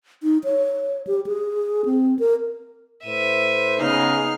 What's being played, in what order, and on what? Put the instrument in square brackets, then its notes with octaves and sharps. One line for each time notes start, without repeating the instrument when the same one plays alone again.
[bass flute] D#4
C#5
G4
G#4
C4
A#4
[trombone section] A2 B4 C5 [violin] E5 D#7
[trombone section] C#3 [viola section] B3 D#4 G#4 [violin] F6 C7